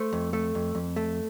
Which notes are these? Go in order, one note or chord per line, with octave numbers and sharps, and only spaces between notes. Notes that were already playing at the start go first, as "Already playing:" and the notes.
Already playing: A3 C5
F2
A3
F2
F2
A3